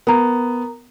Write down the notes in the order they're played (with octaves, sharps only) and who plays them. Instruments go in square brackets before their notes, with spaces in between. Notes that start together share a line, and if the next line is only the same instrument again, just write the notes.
[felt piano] B3 [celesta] A#4 A#5